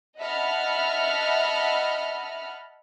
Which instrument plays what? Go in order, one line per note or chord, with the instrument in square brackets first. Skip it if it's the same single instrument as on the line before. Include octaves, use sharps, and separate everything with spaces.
[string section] D#5 E5 F#5 A5 B5 F6